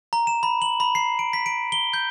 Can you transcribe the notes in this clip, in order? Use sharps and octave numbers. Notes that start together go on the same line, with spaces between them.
A#5
E7
B5
F#7
B5
C7
D7
B6
D7
G7
G6